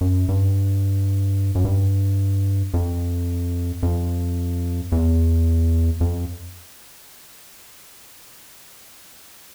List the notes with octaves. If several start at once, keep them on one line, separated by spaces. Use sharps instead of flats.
F#2
G2
F#2
G2
F2
F2
E2
F2